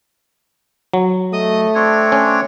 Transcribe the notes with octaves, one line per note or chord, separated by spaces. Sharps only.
F#3
A3 D#5 D#6
C4 D4 C#5
C#4